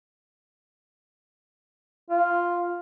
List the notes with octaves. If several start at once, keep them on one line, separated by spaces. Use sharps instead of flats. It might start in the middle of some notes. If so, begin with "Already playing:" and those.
F4